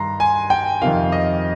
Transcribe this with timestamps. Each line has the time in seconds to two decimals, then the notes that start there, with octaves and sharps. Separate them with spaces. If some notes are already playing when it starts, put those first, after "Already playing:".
Already playing: G2 D#3 A#5 C6
0.20 G#5
0.50 G5
0.82 F2 C3 D#3 F5
1.12 D#5